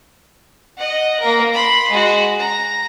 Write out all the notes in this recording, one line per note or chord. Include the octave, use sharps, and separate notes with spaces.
D#5 F#5
A#3 A#4
B5 C6
G#3 F#4
A#5